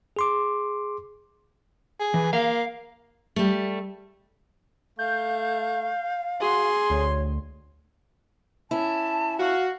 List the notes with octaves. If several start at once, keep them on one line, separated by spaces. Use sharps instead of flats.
G#4 C6 D6
G#4
E3
A#3 F5
G3 A3
A3 F5 G6
F#4 G#4 C6
D2 C#5
C#4 E4 A5
F#4 F5